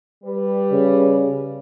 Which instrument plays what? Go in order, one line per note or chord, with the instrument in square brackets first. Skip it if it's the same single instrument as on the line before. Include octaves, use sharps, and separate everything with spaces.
[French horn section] G3 B4
[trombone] C#3